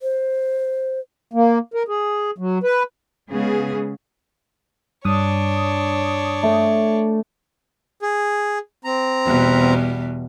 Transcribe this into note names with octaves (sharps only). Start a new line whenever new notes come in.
C5
A#3
A#4
G#4
F#3
B4
C#3 G#3 B3 G#4
G2 D4 C#5 D#6
A3
G#4
C4 A#5
E2 B2 G3